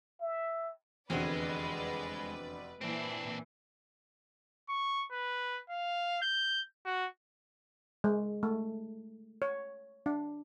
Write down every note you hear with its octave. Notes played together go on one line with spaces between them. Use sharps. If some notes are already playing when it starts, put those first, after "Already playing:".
E5
F1 E2 D3 G#3 C4 F#4 B4 D5
A#2 E3 C4 D4
C#6
B4
F5
G6
F#4
G#3
A3
C#5
D4